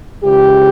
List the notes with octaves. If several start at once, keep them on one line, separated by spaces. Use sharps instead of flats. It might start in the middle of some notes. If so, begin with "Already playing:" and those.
C#2 C#3 E3 G4